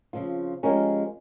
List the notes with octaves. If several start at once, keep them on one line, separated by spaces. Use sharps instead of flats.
C#3 F3 C4 F4
F3 G#3 C#4 G4 A#4